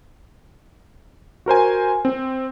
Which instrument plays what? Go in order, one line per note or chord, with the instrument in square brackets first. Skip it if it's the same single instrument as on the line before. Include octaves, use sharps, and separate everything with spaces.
[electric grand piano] F#4 A#4 C5 G#5
C4